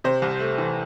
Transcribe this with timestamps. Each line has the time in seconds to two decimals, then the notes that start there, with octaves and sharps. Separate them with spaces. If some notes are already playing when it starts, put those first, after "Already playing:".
0.04 C3 C5
0.22 C2
0.40 A3
0.58 E3